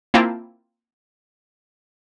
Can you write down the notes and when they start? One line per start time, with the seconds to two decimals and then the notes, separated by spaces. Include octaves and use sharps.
0.14 A#3 C4 E4 F4 G5 A5